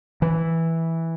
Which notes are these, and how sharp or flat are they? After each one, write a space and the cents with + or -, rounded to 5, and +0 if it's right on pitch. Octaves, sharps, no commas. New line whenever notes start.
E3 -5